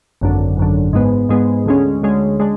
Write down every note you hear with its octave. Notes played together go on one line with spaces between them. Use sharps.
G#1 F#2 D3
G#1 F#2 D3
G#2 G#3 B3
G#2 G#3 B3
D2 D3 G#3 C#4
D2 D3 G#3 C#4
G#3 D4